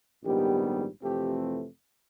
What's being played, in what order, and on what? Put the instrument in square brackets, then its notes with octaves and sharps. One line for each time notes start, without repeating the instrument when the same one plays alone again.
[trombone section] A#1 G#2 D#3 G3 B3 G4
F2 C3 E3 A3 C4 G4